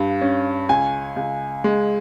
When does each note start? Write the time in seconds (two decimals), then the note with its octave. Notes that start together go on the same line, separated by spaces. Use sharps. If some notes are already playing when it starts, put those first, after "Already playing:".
Already playing: G2 F5
0.21 C#4
0.69 C#2 G#5
1.16 C#2
1.64 G#3